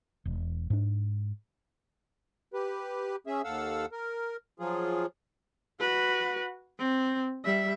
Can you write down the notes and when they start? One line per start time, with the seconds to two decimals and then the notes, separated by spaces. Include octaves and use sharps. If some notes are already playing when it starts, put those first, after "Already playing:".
0.25 E1
0.70 G#2 D4
2.54 G4 B4
3.27 C#4 G#4 E5
3.44 D#2 A4 F5 F#5 E6
3.92 A#4
4.60 F3 F#3 F4 G#4
5.80 F#4 B4
6.79 C4
7.45 G3 E5